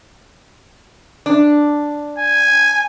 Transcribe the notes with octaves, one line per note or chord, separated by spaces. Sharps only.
D4
G#5